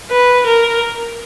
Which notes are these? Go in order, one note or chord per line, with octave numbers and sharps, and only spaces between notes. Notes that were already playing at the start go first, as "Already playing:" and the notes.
B4
A#4